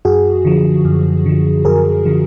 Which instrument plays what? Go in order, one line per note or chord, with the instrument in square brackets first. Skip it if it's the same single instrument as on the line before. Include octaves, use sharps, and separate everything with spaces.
[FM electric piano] F#2 F#4 G#4
D3 F3
F#2
D3 F3
F#2 G#4 A#4
D3 F3